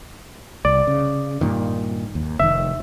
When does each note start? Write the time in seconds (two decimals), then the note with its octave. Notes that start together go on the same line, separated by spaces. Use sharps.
0.65 C2 D5
0.87 C#3
1.41 G2 A#2 D#3
2.15 D#2
2.40 F1 D#3 E5